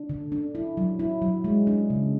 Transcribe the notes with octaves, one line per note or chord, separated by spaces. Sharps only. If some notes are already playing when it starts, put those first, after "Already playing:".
Already playing: D4
D3
D4
E4
F#3
E4
F#3
G#3
D4
C#3